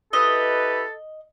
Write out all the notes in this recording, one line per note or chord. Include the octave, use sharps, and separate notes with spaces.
E4 G4 A4 B4 D#5